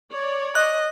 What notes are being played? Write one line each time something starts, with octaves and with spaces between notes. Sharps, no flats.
C#5 D5
D#5 F#6